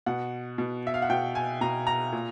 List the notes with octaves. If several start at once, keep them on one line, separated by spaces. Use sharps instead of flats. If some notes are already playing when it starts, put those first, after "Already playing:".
B2 F#5
B2
E5
F5
F#5
B2 G5
G#5
B2 A#5
A#5
A#2